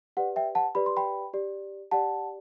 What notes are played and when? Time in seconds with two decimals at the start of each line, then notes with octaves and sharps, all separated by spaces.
0.17 G4 B4 D5 F#5
0.36 E5 G5
0.55 F#5 A5
0.75 G4 B4 D5 B5
0.86 C6
0.97 G5 B5
1.34 G4 D5
1.91 G4 D5 F#5 A5